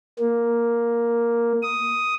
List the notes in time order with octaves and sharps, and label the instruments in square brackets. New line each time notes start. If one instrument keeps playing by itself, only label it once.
[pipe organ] A#3
D#6